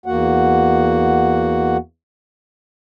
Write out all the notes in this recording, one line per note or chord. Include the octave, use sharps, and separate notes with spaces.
E2 A#3 F#4 F#5